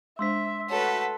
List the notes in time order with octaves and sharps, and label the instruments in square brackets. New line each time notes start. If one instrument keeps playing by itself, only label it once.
[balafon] G#3 D4 C5 [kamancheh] E5 [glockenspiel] C6 E6 B6
[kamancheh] A3 F#4 [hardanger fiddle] A4 B4 [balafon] C#5